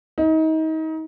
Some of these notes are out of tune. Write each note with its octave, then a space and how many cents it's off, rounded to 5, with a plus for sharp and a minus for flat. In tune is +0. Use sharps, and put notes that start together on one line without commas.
D#4 +30